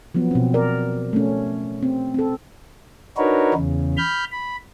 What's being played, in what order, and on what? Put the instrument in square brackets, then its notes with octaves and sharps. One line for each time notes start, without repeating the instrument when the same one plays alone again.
[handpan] F3 F#3 B3
B2 C4
A#4 D5
A3 C#4
C4
C4 A4
[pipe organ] D4 D#4 F#4 A#4 B4 C#5
E2 C#3
B5 F6 G6
B5